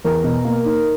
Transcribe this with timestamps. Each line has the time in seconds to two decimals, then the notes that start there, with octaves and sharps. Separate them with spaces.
0.04 E2 A#4
0.24 B2
0.45 A#3
0.65 D#4